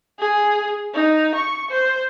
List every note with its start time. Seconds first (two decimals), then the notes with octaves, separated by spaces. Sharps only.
0.19 G#4
0.94 D#4
1.35 C#6
1.71 C5